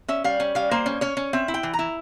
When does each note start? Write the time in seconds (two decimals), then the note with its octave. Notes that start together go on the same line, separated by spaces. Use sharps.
0.08 C#4 E5
0.24 G3 F5
0.40 C#4
0.55 G3 F5
0.71 A#3 C5
0.86 C#4
1.01 C#4 C#5
1.17 C#4
1.33 C4 E5
1.48 E4
1.54 G5
1.63 E3
1.73 A#5
1.79 E4